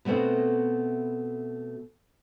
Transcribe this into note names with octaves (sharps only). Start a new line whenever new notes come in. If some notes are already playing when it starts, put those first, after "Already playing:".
B2 A3 B3 C4 F#4